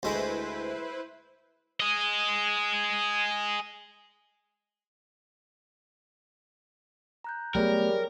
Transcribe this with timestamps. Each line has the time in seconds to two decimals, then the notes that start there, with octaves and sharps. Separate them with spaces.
0.03 D2 G#3 E4 B4 C5
1.80 G#4 D#5
7.24 A#5 F#6 G6
7.55 F#3 G3 A3 B3 G#4 A#4 C#5 G5